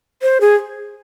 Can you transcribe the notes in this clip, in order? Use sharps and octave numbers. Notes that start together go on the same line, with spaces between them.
C5
G#4